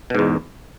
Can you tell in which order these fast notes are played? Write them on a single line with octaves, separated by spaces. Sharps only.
B2 G#2 E2